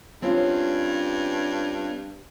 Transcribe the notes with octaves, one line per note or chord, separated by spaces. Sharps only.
G2 C4 C#4 F4